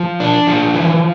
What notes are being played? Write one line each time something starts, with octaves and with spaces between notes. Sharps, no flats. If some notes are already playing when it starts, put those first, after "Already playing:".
Already playing: F3
D4
F3
E3